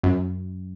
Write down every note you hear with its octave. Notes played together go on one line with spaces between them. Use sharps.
F#2